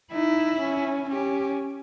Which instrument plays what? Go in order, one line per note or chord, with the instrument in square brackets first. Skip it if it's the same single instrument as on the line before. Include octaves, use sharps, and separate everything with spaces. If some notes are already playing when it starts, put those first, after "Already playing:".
[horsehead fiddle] D#4 [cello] E4
[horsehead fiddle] C#4
[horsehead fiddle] C#4 [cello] G4